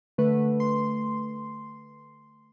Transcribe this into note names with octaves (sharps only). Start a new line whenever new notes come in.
D3 A3 B4
C6